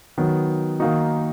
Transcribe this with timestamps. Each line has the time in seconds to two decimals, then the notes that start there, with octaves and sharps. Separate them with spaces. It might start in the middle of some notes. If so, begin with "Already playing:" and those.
0.18 D#3 F#3 B3
0.80 D#3 A#3 D#4 F#4